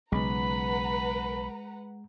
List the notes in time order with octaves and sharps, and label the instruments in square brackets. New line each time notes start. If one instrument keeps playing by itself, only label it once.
[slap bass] B1 C#3 [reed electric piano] G#3 [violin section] B4 F#5 A#5 [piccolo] B5